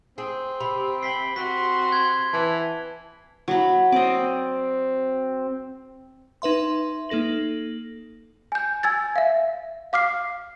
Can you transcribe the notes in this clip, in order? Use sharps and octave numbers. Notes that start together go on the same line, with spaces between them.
C4 G#4
C3 B5
G5 B5 B6 C7
C4 F#4 C6 B6
G#6
E3 B3 A5
F#3 B5
C4 D5 D#5
D#4 B4 E5 C6
A#3 D#4 A4 A#6 F#7
G#5 G6
G#5 E6 G#6 A6
E5 F5
F5 D6 F6 C7